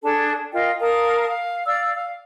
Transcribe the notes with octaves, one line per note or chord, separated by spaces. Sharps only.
D4 G#4 A4 A5
F4 A#4 D#5 G5
A#4 F5 A5 D#6
F5
D5 F5 E6
F5